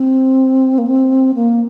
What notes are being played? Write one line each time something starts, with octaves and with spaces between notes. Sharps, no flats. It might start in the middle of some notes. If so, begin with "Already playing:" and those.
Already playing: C4
A#3
C4
A#3